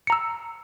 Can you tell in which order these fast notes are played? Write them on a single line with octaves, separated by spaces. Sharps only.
C#7 A#5 E6